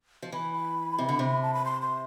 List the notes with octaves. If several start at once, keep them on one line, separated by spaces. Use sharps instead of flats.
F3
E3 B5
C3
D3
C3
A5
B5
C6
C6